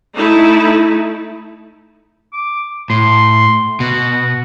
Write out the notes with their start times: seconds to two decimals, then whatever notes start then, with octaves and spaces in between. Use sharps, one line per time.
0.15 A3 D#4 E4
2.33 D6
2.90 A2 C6
3.80 B2 F#4